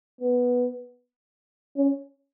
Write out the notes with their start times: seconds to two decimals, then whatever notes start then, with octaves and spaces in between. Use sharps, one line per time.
0.21 B3
1.77 C#4